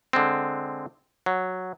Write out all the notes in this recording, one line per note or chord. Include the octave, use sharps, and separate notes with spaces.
D3 G#3 C4
F#3